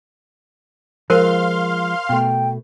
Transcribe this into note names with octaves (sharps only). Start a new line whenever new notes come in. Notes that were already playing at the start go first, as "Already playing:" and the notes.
F3 G#3 F4 A#4 C5 F5 C6 F6
B2 A3 G5